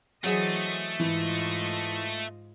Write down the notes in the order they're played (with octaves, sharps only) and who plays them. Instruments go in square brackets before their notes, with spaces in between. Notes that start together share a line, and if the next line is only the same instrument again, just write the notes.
[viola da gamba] E3 C5 D#5 [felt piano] F#3 G#4 [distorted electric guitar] A3
[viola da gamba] G#2 F4 D#5 [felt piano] E3